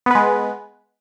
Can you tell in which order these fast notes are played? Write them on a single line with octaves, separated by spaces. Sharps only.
B3 B4 G#3